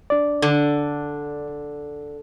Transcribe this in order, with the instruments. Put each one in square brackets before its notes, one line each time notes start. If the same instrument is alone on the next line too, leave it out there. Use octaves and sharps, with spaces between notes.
[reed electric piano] D4 D5
[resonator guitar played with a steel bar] D3